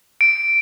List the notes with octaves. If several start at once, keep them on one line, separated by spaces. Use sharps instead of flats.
D7